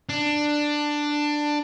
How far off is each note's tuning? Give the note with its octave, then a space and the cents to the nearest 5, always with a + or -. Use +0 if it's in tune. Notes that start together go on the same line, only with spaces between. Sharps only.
D4 +10